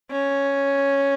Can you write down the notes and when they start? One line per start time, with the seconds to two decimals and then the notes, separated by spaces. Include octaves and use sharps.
0.12 C#4